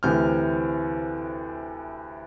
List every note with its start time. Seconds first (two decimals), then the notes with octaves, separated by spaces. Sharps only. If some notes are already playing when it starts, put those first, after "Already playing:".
0.03 D2 C3 E3 F6 G6